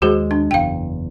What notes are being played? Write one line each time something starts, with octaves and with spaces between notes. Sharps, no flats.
D#2 G#3 F#4 G#4 C5
D4
F#1 E2 F5 G5